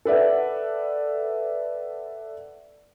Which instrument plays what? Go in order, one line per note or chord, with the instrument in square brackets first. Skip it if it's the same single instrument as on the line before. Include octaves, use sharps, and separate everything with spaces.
[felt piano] A4 B4 D5 E5 F#5